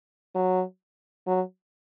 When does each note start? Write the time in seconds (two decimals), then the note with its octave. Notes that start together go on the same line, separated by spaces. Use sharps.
0.35 F#3
1.27 F#3